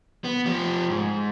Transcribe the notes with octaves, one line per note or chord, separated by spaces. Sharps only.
B3
F3 G4
G#2